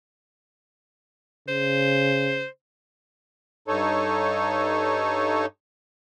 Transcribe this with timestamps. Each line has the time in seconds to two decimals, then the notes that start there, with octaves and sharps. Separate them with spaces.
1.48 C#3 C5
3.68 G2 D#4 A4 C#5